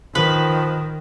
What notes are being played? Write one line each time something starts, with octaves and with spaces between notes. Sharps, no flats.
D#3 F3 B4